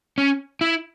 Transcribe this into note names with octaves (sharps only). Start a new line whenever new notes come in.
C#4
E4